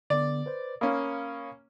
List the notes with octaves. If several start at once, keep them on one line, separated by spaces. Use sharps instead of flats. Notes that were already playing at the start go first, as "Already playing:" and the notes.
D3 B3 D5
B4 C5
A#3 C#4 F5 B5 D#6